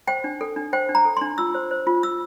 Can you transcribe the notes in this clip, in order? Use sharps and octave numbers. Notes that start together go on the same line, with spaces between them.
C5 G5
D4
A4
D4
C5 G5
D4
A#5
A4
D4 C6
F4 E6
C5
C5
F4
F4 E6